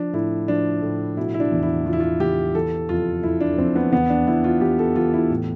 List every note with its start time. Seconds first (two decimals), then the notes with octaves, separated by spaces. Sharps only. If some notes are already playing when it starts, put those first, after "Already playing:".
Already playing: F3 D4
0.13 A2 E4
0.48 F3 D4
0.82 A2
1.17 B2 E4
1.34 E4
1.40 D4
1.52 E2
1.63 E4
1.86 E2 F4
1.93 E4
2.00 F4
2.20 E2 G4
2.54 E3 A4
2.89 F2 F4
3.23 F2 E4
3.41 D4
3.58 F2 C4
3.75 B3
3.92 E2 B3
4.10 D4
4.28 E2 E4
4.44 F4
4.61 E2 G4
4.79 A4
4.96 E3 F4
5.14 E4
5.30 A2